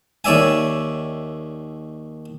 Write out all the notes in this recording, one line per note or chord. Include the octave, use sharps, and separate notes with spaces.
D#2 C#5 D5 E5 G#5